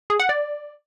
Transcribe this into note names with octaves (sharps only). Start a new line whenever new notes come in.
G#4
F#5
D5